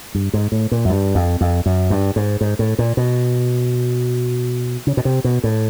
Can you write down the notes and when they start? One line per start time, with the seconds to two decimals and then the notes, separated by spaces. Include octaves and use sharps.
0.14 G2
0.33 G#2
0.52 A2
0.71 A#2
0.85 F#2
0.90 G2
1.15 F2
1.41 F2
1.66 F#2
1.90 G2
2.16 G#2
2.41 G#2
2.59 A2
2.79 A#2
2.97 B2
4.87 C#3
4.97 B2
5.05 C3
5.24 B2
5.44 A2